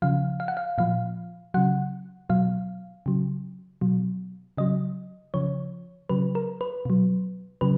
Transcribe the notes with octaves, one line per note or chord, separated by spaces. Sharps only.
C#3 F3 F5
F5
F#5
F5
A#2 F3 F5
C#3 F#3 F#5
B2 F#3 F5
C#3 F#3
B2 F#3
C#3 F#3 D#5
C#3 F3 C#5
C#3 F#3 B4
A#4
B4
B2 F#3
C#3 F#3 B4